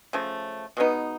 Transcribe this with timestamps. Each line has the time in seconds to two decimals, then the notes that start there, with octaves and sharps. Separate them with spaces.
0.13 C#3 F3 A3
0.77 B2 G#3 B3 D#4